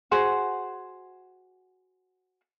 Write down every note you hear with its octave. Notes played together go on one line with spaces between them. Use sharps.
F#4 G#4 C5 F#5